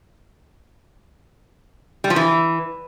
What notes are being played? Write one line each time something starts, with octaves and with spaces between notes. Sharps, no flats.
G3
F3
E3